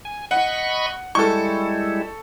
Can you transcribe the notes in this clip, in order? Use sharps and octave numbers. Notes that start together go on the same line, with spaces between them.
G#5
D#5 F#5 B5 C#6
G3 G#3 E4 A4 C#6